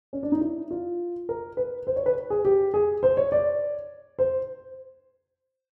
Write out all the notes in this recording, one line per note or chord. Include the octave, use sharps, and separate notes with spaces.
C#4
D4
D#4
E4
F4
A#4
B4
C5
C#5
B4
G#4
G4
G#4
C5
C#5
D5
C5